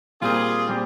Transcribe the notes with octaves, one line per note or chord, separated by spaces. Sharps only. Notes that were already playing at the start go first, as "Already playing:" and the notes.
A#2 G3 C4 F4 G4 G#4 A#4
A#2 G3 C4 G4